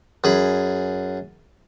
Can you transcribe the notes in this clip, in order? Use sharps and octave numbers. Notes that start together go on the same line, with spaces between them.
F#2 G#4 B5